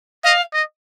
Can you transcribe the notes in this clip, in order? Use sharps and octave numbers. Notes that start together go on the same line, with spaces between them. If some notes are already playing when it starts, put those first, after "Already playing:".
D#5 F5
D#5